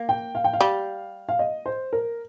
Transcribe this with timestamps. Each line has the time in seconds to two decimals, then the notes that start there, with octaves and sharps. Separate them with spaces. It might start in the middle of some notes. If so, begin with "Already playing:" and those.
Already playing: A#3
0.09 G5
0.35 F5
0.44 G5
0.53 F5
0.61 G3
1.29 F5
1.39 D#5
1.66 C5
1.93 A#4